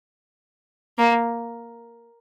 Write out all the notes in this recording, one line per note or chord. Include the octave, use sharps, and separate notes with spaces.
A#3